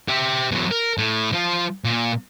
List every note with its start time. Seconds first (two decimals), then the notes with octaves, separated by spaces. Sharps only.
0.08 G4 E5
0.52 E2 F#3
0.71 A#4
0.98 A2
1.32 F3 F4
1.84 A#2